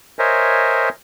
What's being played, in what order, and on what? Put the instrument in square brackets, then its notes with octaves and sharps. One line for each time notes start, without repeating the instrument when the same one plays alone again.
[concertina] A#4 C5 C#5 D#5 E5 G#5